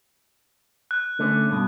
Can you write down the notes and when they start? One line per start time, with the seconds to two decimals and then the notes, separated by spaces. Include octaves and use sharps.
0.91 F#6
1.19 D3 A3 C#4
1.51 G2 B2